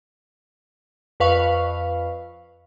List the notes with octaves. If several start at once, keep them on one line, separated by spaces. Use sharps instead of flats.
F2 B4 F5 C#6